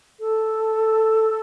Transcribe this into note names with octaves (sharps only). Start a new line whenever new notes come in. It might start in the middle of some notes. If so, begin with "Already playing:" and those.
A4